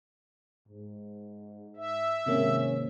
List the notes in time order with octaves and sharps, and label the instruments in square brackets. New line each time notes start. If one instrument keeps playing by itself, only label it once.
[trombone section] G#2
[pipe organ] E5
[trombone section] G#2 C#4 [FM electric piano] C3 D#3 A#3